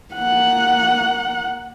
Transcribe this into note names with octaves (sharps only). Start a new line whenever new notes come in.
A#3 F#5